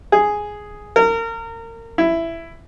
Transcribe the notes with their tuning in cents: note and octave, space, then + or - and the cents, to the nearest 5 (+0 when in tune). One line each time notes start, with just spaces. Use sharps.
G#4 +0
A#4 -30
E4 +10